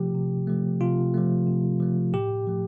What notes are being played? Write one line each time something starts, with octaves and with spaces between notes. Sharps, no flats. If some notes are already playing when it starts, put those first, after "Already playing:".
Already playing: C3 F3 A3 G4
C3
F3 A3
C3 F4
F3 A3
C3
F3 A3
A2 G4
F3 A3